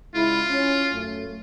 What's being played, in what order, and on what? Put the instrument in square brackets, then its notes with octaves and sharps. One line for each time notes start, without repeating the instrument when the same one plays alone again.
[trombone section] C#3 G#3 E4 [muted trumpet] F4
[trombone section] C#4
F#2 A3